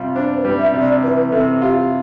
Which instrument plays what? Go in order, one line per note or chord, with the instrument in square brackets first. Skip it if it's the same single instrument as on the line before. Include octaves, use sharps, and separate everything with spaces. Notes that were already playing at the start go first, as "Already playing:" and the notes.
Already playing: [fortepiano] C3 G3 F4
[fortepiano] D4 [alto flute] C5
[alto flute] B4
[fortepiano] G3
[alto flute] E5
[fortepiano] C3
[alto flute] D5
[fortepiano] E3 [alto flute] B4
[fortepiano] C3 [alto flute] A4
[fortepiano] F4 [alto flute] G4